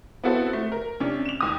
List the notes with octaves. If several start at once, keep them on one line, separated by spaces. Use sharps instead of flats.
B3 C4 E4 F#4 A4 C5
A3
A#4
C3 C#4 D4
E7 F7
D#2 D#6